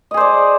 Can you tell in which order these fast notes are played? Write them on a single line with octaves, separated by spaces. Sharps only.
D#5 G#4 C5 D5